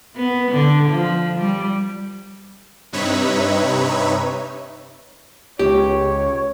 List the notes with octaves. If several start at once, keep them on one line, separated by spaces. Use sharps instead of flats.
B3
D3
F3
G3
G2 C3 D#4 B4 C#5 E5
C#2 G4 C#5